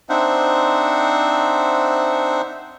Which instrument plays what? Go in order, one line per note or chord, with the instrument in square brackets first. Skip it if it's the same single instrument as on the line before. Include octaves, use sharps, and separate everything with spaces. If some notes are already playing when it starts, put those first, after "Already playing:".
[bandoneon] C4 D4 D#4 C5 E5 F#5